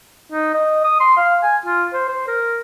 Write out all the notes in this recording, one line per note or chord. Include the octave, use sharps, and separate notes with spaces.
D#4
D#5
D#6
C6
F5
G#5
F4
C5
C5
A#4